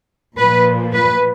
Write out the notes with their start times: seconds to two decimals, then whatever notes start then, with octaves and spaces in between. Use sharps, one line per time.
0.37 A#2 F3 B4
0.93 B4